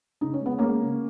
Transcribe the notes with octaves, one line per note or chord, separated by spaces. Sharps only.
C#3 D#4
C#4
G#3 B3
G#3 A#3 C#4
C#3